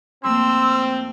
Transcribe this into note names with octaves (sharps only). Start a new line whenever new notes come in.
F2 A3 A#3 C4 C6 E6